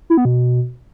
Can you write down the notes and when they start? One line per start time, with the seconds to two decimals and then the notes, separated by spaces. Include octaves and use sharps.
0.10 E4
0.17 B3
0.25 B2